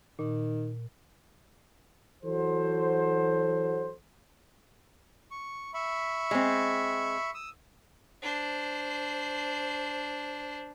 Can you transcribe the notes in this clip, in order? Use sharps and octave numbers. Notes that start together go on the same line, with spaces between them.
A#2 D#3
E3 F#3 F#4 A4 C5
C#6
E5 B5 C#6
G#3 C4
D#6 E6
D4 C5